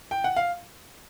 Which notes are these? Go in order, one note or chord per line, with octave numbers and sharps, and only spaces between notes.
G5
F#5
F5